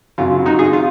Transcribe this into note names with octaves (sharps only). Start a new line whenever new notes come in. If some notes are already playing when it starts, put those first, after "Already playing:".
F#2 C#3 F#3 F4
D#4 F#4
F4 G#4
F4